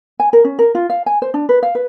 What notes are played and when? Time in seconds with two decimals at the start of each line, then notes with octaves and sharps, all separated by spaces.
0.20 G#5
0.33 A#4
0.44 C#4
0.59 A#4
0.75 F4
0.90 F5
1.06 G#5
1.22 C5
1.34 D4
1.49 B4
1.63 F5
1.75 B4